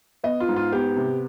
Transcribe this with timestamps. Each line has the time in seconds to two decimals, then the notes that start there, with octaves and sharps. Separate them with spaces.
0.24 B3 D#5
0.40 F4
0.48 G#2
0.56 F4
0.72 B3 G4
0.96 C3